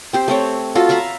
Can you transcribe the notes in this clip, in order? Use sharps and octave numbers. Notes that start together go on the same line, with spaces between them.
C4 G4 C5
A3 C4 C#5
F4 F#4 A4
E5 F5 A#5 B5